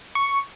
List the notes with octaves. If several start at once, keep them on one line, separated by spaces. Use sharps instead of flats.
C#6